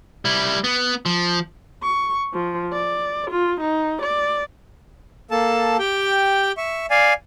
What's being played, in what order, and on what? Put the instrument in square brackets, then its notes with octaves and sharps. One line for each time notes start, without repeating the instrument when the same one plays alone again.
[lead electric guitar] G3 E4
B3
F3
[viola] C#6
F3
D5
F4
D#4
D5
[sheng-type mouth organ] A#3 A4 A5
G4 G5
E5 C#6
D5 F5 G#5